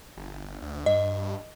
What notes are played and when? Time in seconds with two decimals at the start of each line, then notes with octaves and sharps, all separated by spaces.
0.17 G1
0.62 D2
0.86 G2 D#5